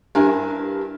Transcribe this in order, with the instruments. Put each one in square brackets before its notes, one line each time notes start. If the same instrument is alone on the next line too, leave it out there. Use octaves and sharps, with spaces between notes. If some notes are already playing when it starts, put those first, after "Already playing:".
[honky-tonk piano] G2 [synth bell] D4 G4 [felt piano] E4 A#4 G#5